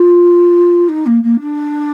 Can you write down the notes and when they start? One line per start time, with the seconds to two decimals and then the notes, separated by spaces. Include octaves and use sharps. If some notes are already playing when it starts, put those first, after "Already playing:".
Already playing: F4
0.88 D#4
1.06 A#3
1.23 A#3
1.40 D4